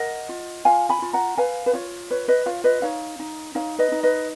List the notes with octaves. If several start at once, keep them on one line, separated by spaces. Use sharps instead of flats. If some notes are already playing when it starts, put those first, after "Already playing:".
Already playing: A#4 D#5 F#5
F4
F4 F5 G#5
G#5 B5
F4
F#5 A#5
B4 F5 G#5
B4
F4 C#5
B4 C#5
B4 D#5
F4 C#5 F5
B4 D#5
D#4 C#5 F5
D#4
D#4 C#5 F5
B4 D#5
D#4
B4 D#5